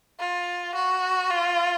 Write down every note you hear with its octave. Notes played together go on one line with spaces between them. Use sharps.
F4
F#4
F4